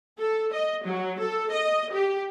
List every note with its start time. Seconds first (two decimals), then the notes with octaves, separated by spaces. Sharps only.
0.19 A4
0.53 D#5
0.85 F#3
1.19 A4
1.51 D#5
1.92 G4